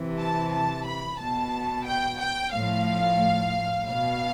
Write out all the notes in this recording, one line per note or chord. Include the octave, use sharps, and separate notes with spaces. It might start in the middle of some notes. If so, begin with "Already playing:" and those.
Already playing: C3 E3
A5
A5
B5
B2 A5
G5
G5
A2 F3 F5
B2 F5